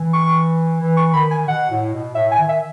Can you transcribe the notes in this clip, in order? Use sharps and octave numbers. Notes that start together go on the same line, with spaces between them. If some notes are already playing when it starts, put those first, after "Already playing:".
Already playing: E3
C#6
E3
C#6
D#3 B5
G#5
B2 F#5
A2
B2
A2 E5
G#5
D#3
E5